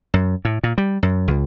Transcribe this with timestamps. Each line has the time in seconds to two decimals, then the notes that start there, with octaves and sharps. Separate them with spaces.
0.14 F#2
0.45 A2
0.63 A#2
0.78 G3
1.03 F#2
1.28 C#2